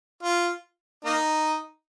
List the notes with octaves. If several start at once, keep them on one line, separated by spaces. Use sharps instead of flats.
F4
A#3 D#4